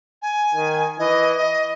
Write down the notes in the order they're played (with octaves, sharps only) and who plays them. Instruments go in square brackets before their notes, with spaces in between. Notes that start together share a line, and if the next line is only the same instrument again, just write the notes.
[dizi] G#5
[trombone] D#3
[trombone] E3 [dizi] D#5
[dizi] D#5